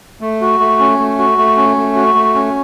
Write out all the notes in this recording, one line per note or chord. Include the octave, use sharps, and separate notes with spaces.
A3
F#4
A3
C#4
A3
F#4
A3
C#4
A3
F#4
A3
C#4